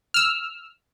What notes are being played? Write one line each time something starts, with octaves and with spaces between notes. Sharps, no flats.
E6 F6